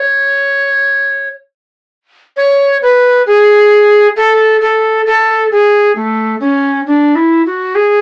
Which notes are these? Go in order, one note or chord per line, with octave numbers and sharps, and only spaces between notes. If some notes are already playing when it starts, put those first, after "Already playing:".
Already playing: C#5
C#5
B4
G#4
A4
A4
A4
G#4
A3
C#4
D4
E4
F#4
G#4